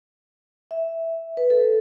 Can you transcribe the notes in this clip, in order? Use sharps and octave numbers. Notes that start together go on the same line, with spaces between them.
E5
B4
A4